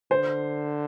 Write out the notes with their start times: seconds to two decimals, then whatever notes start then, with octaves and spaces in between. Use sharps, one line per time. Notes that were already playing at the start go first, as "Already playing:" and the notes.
0.11 D3 C5